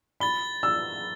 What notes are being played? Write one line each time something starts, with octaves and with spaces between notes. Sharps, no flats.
B5 A6 G7
E6